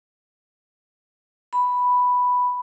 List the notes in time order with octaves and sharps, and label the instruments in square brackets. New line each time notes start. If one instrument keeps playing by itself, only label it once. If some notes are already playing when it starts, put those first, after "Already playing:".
[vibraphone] B5